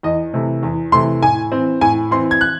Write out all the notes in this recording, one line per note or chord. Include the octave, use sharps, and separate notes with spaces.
E2 D#5
C3 E3 A3
E2
C3 E3 A3 C6
A2 G#5
E3 C4
A2 G#5
E3 C4 C6
G#6
F#6